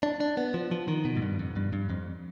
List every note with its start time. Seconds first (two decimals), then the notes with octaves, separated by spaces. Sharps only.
0.03 D4
0.20 D4
0.37 B3
0.54 F3
0.71 F3
0.88 D#3
1.05 B2
1.17 G#2
1.22 G2
1.39 F2
1.56 G2
1.73 G2
1.90 F2